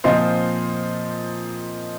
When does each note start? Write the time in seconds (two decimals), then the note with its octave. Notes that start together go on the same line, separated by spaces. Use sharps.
0.04 A#2 F3 C4 D#4 C5